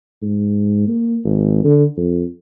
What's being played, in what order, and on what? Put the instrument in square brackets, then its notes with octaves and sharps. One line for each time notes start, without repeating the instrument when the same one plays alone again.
[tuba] G#2
A#3
G#1
D3
F2